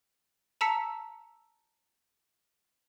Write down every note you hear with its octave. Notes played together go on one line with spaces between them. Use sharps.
A5 A#5 E6 B6 C#7